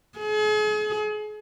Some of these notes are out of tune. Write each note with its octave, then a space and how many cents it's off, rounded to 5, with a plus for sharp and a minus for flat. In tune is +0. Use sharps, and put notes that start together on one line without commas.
G#4 +40